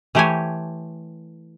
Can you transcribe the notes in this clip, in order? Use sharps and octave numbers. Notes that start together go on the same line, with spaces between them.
E3 A3 G4 C5 C#5 G#5